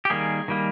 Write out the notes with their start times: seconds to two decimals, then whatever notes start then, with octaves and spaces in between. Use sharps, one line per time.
0.05 G4
0.10 D#3 G3 A#3 G#4
0.48 D#3 G3 A#3